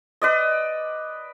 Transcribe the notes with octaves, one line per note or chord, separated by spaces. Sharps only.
B4 D5 D#5